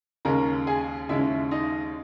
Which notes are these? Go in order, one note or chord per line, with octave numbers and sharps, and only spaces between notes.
D#2 C#3 G#3 C#4 A#4 A#5
G#4 G#5
D#2 C#3 G#3 C#4 E4 E5
D#4 D#5